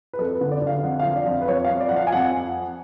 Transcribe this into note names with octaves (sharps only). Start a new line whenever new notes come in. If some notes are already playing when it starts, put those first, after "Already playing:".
B4
F2 A4
B4
D3
D5
D3
F5
F2 F#5
F5
F3
D5
F2
F5
B4
F2 C#5
F5
F2
D5
F3 F#5
F5
G#5
F2 F#5